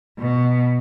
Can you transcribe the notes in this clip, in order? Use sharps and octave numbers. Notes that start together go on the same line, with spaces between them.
B2